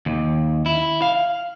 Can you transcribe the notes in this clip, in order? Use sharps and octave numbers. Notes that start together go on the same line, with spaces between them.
D#2
E4
F5